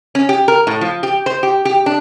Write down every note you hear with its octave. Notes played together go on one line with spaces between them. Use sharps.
C#4
G4
A#4
A2
F3
G4
C5
G4
G4
D4